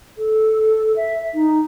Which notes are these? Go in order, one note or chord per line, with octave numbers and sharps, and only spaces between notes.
A4
E5
D#4